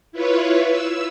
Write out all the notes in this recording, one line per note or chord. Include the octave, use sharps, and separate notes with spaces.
E4 F4 B4 C#5
E6